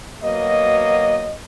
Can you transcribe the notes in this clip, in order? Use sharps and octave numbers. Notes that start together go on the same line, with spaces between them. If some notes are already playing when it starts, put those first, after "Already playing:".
B2 F#3 A#3 D#5